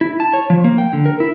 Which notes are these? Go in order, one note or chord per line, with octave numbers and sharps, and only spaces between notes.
E4
A5
C#5
F3
A#3
G5
D3
A#4
E4